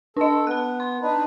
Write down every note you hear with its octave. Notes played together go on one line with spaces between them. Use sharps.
D4 A4 D#5
B3 A5 F#6
C6
D4 D#4 B4